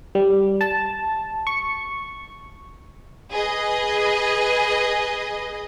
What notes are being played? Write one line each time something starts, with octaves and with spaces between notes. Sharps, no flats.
G3
A5
C#6
G#4 B4 D#5